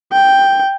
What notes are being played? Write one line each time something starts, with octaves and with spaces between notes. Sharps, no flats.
G5